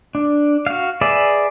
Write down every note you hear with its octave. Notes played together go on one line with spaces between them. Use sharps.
D4
F#4 F5
G#4 B4 D5 E5